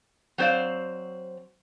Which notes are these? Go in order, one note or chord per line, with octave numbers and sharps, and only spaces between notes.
F#3 C4 C5 D5 F5